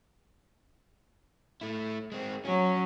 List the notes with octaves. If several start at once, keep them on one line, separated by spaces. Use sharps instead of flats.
A3 E4
G#3 C4
F#3 C#4